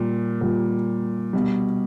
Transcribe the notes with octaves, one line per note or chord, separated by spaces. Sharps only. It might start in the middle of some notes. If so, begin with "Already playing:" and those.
Already playing: A#2 G3
A#2 G3
B2 G3